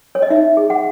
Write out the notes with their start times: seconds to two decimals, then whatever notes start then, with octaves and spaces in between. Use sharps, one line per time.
0.15 C#5
0.22 D#5
0.30 D#4 E5
0.57 G#4
0.70 F#5